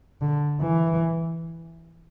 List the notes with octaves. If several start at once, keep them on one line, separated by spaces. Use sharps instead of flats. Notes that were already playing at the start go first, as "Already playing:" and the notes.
D3
E3